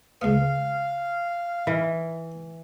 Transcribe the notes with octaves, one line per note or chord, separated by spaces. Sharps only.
C#2 B3 F5
E3